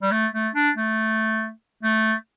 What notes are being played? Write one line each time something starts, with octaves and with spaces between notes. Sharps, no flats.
G3
A3
A3
D4
A3
A3